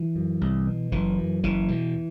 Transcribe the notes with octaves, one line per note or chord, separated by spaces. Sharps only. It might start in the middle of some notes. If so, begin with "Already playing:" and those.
Already playing: E3
F#2
C2
B2
F#1 E3
F#2
F#1 E3
E2 B2